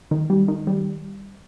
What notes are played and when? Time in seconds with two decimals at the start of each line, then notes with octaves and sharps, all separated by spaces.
0.11 D#3
0.30 G3
0.48 D#3
0.67 G3